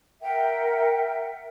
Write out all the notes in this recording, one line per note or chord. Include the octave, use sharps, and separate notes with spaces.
A#4 E5 F#5 G5